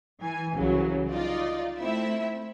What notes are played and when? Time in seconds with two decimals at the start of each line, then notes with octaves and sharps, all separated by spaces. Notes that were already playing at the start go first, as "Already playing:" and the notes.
0.20 E3 G#5
0.53 C2 C#3 E3 F#3
1.11 D#4 F4 D5
1.77 A3 C4 E4 E5